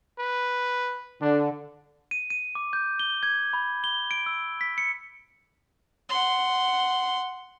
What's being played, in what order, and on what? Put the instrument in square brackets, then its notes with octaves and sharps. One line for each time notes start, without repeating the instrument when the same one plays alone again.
[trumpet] B4
[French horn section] D3 [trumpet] D4
[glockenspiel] D#7
D#7
D6
G6
G7
G#6
B5
G7
D7
E6
B6
C#7
[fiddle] F#5 C6